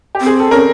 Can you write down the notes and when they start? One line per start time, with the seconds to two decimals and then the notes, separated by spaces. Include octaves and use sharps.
0.15 G4
0.21 C4
0.26 G#4
0.40 A4
0.51 C#4 A#4